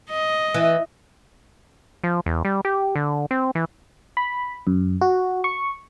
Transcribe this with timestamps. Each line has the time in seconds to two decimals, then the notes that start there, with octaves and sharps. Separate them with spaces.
0.10 D#5
0.54 E3
2.04 F3
2.26 E2
2.45 G3
2.65 G4
2.96 D3
3.31 C4
3.55 E3
4.17 B5
4.67 F#2
5.01 F#4
5.44 C#6